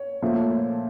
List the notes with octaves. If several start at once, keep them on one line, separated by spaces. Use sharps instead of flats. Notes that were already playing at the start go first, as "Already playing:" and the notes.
Already playing: C#5
A#2 F3 A3